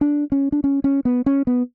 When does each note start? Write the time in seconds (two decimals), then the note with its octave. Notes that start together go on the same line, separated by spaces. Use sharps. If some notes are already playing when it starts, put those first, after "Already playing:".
0.01 D4
0.32 C#4
0.52 D4
0.64 C#4
0.84 C#4
1.05 B3
1.26 C#4
1.47 B3